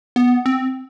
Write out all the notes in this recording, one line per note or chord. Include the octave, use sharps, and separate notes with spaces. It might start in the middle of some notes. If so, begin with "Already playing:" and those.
B3
C4